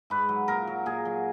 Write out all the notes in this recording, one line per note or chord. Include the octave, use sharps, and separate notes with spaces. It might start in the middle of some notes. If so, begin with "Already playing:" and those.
G#2 B4
F#3
A#2 A#4
F#3
A#2 G#4
F#3